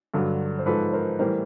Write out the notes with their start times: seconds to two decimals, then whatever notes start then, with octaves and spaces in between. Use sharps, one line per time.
0.14 G2 D3 F#3
0.59 C5
0.66 G#2 F3 A4 B4
0.93 A#4 C5
1.19 A2 E3 G3 A#4 C5